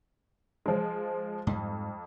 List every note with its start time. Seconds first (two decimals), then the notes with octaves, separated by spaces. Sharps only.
0.66 F3 G#3
1.47 F2 G#2 G3